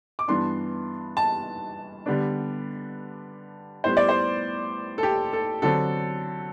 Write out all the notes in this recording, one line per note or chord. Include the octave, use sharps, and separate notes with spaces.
D6
G2 E3 B3 D4 C6
A5
D3 G3 B3 D4
A2 G3 B3 C5
D5
C5
A4
G4
A4
D3 F#3 C4 A4